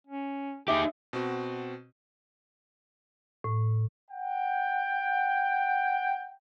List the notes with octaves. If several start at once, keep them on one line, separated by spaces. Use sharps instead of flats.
C#4
D#4 G4 G#4 E5 D6
B2 C4 F#4
A2
F#5 G5